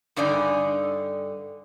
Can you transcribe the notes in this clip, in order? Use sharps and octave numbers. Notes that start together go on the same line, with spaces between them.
G2 D3 D#4 D5 G#5